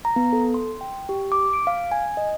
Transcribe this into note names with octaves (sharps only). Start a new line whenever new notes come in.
A#5
B3
A4
C6
G5
G4
D6
D7
F5
G#5
D#5